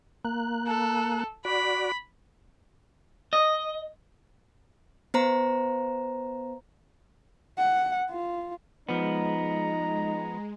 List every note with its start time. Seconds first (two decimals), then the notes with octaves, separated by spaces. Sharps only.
0.25 A#3 F#6
0.67 A4
1.45 F#4 D5 B5
3.33 D#5
5.14 B3 C5 A#5
7.57 F#5
8.10 F4
8.89 F3 G#3 B3 D#4 A#5